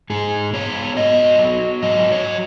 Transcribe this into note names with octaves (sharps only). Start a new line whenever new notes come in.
G#2 G#4
B3 C#5
F#3 D#5
F#3
G#2 D#5
C#5